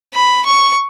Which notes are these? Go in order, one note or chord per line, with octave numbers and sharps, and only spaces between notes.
B5
C#6